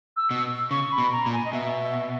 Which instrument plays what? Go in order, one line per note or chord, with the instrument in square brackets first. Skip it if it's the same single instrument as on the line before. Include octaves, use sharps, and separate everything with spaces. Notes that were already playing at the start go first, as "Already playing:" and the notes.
[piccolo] E6
[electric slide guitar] B2
[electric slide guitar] C#3 [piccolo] C#6
[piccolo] B5
[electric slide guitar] B2
[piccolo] A#5
[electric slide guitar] A#2
[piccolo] G#5
D#5
[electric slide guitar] B2 [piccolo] E5